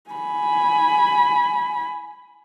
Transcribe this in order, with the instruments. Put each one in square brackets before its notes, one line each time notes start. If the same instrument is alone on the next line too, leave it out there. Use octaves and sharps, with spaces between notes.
[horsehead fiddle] G#5 B5